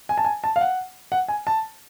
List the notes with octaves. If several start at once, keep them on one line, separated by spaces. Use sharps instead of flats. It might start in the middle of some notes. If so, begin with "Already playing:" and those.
G#5
A5
G#5
A5
F5
F#5
F#5
G#5
A5